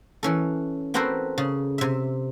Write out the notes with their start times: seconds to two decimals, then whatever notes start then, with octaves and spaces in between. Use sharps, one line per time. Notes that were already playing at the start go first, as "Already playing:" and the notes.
0.23 E3 C#4 A4
0.94 B3 C4 F#4 A4 A#4 C5
1.38 C#3
1.78 C3 E5